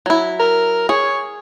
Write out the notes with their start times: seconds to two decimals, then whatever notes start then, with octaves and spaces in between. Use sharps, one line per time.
0.06 F#3 E4
0.40 A#4
0.89 G#4 C#5